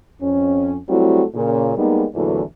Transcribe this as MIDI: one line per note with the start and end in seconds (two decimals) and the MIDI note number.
0.21 0.77 41
0.21 0.77 61
0.89 1.23 54
0.89 1.23 55
0.89 1.23 57
0.89 1.23 60
0.89 1.23 64
0.89 1.23 66
1.35 1.75 46
1.35 1.75 49
1.77 2.05 55
1.77 2.05 56
1.77 2.05 58
1.77 2.05 59
1.77 2.05 63
2.15 2.42 40
2.15 2.42 46
2.15 2.42 50
2.15 2.42 52
2.15 2.42 54
2.15 2.42 57